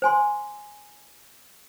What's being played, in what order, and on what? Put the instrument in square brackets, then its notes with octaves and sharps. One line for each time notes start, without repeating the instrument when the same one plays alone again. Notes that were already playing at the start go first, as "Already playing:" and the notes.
[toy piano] C5 G#5 C6